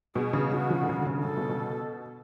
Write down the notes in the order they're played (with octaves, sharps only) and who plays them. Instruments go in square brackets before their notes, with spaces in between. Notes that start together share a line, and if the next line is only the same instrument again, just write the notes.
[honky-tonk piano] B2 [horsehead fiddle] G#4
[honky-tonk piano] C#3
[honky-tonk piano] C#3 [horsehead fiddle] F#4
[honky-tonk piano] F3
D3
C#3
D3
C#3
D3
[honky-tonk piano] C#3 [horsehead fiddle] A4
[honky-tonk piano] B2
B2